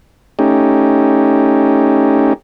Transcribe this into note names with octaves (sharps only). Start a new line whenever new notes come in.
A3 C#4 D#4 G4